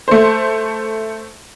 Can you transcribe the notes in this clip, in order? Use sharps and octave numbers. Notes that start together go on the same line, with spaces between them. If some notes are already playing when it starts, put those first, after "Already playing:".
A3 C5